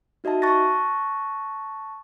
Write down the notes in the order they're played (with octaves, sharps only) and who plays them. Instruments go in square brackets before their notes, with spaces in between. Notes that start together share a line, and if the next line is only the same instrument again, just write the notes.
[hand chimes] D#4 F#4 D#5 E5 A5
A5 C#6 F#6 A6 A#6